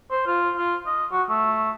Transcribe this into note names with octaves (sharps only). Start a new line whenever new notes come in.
C5
F4
F4
D#5
F#4
A3